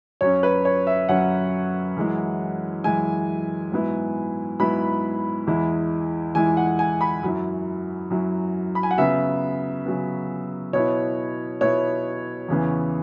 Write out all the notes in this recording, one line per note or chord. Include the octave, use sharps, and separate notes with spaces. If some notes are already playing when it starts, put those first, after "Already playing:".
F#2 F#3 C#4 C#5
B4
C#5
E5
F#2 F#3 C#4 F#5
F#2 E3 G#3 E4
F#2 E3 G#3 E4 G#5
G#2 F#3 B3 E4
G#2 F#3 B3 E4 B5
E2 E3 G#3 E4
E2 E3 G#3 E4 G#5
F#5
G#5
B5
F#2 F#3 E4
F#2 F#3 E4
B5
G#5
F#5
C#3 F#3 B3 E5
C#3 F#3 B3
B2 B3 E4 C#5
B2 B3 E4 C#5
E2 C#3 E3 B3